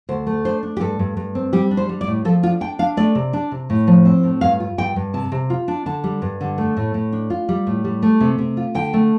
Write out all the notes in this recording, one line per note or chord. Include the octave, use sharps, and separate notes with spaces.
D2 C5
A3
D4 C5
D4
G4
G2 A4
G2
G2
C4
G3 G4
D4
C5
G3
D5
A2
F3 A4
D4 F4
D4 G5
D4 F5
A3 D5
C3
D4
C3
A2
F3
C4
A2
G2 F5
F4
G2 G5
G2
C3 A5
C3
F4
D4
D3 A5
G3
G2
D3
A3
A2
A2
D4
F4
G3
A2
G3
A3
C3
C3
F4
D3 G5
A3